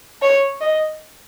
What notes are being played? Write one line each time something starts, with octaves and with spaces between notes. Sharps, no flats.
C#5
D#5